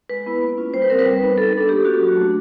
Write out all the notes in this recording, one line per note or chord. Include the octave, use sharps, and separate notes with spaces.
G#3 B4
B3 E4
A#3
C#4 F4
G3 C5
B4
C4 F4 A#4
B4
G3
B3 D#4
G3 A4
B3 D4 A4
A#3 G4
C#4 F4 F#4
F#3
A3 D4